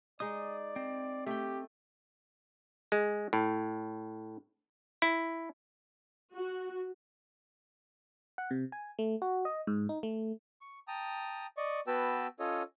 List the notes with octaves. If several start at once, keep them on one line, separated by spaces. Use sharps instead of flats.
G#3 D#4 D5 D#6
C4
A3 G4 G5
G#3
A2
E4
F#4
F#5
C3
G#5
A3
F#4
D#5
G#2
D#4
A3
C#6
G5 A5 A#5 D#6
D5 D#5 C#6
B3 F#4 B4 G5 A5 E6
C#4 F4 A4 C#5 D#5